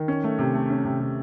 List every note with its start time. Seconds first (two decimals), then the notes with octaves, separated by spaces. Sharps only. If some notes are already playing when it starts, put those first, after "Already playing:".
Already playing: D#3
0.08 C#4
0.24 A3
0.39 C3
0.54 A3
0.70 C#4
0.85 C3
1.00 C3